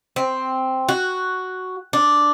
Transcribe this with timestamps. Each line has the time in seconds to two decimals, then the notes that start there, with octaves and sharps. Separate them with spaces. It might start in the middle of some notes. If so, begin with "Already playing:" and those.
0.16 C4
0.89 F#4
1.93 D4